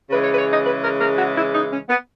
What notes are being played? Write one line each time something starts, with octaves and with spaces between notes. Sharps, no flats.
C#3 E3 G#3 B4
C#5
B4
C#5
D#5
B4
A#4
A#4
F#4
E4
D#4
C#4
B3